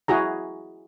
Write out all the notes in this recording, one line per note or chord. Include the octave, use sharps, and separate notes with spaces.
E4 F#4 G#4 A#5